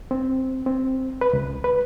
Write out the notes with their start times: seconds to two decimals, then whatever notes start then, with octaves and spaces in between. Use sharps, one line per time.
0.11 C4
0.66 C4
1.21 B4
1.33 C#2
1.64 B4